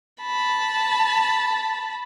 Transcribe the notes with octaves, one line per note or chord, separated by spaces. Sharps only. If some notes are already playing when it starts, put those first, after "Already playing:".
A5 B5